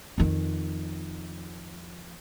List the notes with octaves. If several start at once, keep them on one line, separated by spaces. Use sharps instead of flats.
F2 D#3